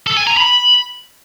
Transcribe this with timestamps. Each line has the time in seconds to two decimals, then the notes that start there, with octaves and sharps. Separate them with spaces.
0.07 A4
0.17 G#5
0.27 A#5
0.37 B5